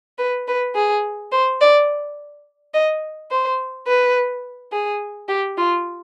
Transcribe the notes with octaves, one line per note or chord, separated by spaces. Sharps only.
B4
B4
G#4
C5
D5
D#5
C5
B4
G#4
G4
F4